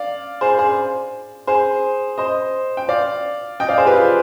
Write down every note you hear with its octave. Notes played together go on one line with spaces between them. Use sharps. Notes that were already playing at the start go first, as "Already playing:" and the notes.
Already playing: D5 F5
G#4 C5
G#4 C5
G#4 C5
C5 D#5
G5
D5 F5
D#5 G5
D5 F5
G#4 C5
G4 B4
F4 G#4